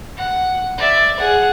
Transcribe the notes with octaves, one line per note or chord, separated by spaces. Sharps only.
F#5
D5 E5
G#4 F#5